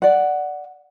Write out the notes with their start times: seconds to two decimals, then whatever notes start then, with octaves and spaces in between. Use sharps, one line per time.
0.02 D5 F#5